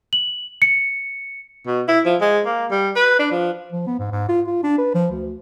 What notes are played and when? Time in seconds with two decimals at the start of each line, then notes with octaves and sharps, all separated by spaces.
0.13 F#7
0.62 C#7
1.67 B2
1.88 E4
2.05 F3
2.21 G#3
2.46 A#3
2.71 G3
2.96 B4
3.19 D4
3.32 F3
3.72 F3
3.87 B3
4.00 G#2
4.12 G#2
4.29 F4
4.47 F4
4.63 D4
4.78 B4
4.95 F3
5.11 D2